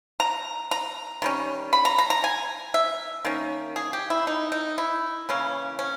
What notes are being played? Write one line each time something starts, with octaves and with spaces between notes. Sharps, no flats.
A#5
A#5
D#3 G3 C#4
B5
A#5
A#5
A#5
G#5
E5
D#3 A#3 C#4
G#4
G4
E4
D#4
D#4
E4
C#3 E3 A#3 C#4
C#4